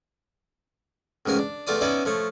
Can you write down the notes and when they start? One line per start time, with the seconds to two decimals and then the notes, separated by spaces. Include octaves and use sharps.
1.26 A1 G#2 C#3 A#4 G#5
1.39 D4
1.67 E2 A3 F4 D5 D#6
1.81 B3 C#4 D#4 E4 D5 E5
2.05 F3 A3 C#5